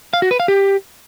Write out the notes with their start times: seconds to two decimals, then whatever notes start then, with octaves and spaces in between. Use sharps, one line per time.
0.13 F5
0.22 F#4
0.31 B4
0.40 F5
0.48 G4